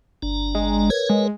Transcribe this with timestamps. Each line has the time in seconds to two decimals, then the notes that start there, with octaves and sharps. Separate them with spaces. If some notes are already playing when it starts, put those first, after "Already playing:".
0.23 G1 D4 A#5
0.55 G#3
0.90 A#4 B4 C#5 G#6
1.09 G#3